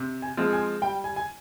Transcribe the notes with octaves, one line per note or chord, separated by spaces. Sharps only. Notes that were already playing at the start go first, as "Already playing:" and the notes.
Already playing: C3
G#5
F3 G#3 C4 F4
G#5
G3 G5
G#5
G#5